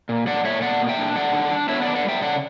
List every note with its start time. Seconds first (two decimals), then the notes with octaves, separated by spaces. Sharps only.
0.09 A#2
0.27 G3 D5 F#5
0.44 A#2 C#5 E5
0.62 B3 D5 F#5
0.80 A#2
0.89 E5 G5
0.98 D4
1.15 G3 D5 F#5
1.33 D4
1.51 D4
1.69 B3 C#5 E5
1.82 D5 F#5
1.87 D4
1.95 D5 F#5
2.04 G3 E5 G5
2.22 C#3 D5 F#5